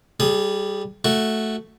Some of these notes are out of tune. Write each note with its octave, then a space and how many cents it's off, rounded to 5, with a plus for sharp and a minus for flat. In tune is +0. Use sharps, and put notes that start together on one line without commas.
G3 +0 G#4 +40 D#6 -5
A3 -5 F#4 +0